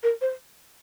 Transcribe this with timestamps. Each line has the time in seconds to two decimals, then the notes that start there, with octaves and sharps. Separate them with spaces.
0.03 A#4
0.21 C5